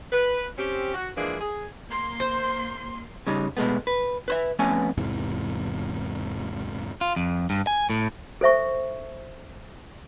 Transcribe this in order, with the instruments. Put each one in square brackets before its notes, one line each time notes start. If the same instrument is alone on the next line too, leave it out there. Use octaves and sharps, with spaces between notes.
[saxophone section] B4
C4 C#4 G4
F#4
E3 F3 G#3 A#3 D4 G#4
G#4
[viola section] A#3 C6
[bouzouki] C5
[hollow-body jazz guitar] C#3 G3 D#4
B2 G#3 A3 B3
B4
B4 C5 E5
F2 A3 B3 C#4 G#5
[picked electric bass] E2 G#2 C3 E3
[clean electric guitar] F4
F2
G2
G#5
A2
[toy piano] A4 C5 E5 C#6